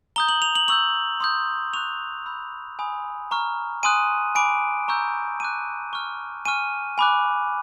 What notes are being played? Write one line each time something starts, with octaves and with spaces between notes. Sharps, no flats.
A#5 D#6 G6 G7
F#7
F7
F#7
C#6 E6 G6 F#7
C6 D#6 G6
C#6 F#6 F7
B5 E6 G6
G#5 B5 D#6
A#5 C#6 F6
G#5 C6 D#6 F#6 D#7
G#5 B5 D6 D7
A#5 C#6 E6 G6
A5 D6 F#6 D#7
C#6 F6
G#5 C#6 F6 D#7
G#5 B5 D6 F#6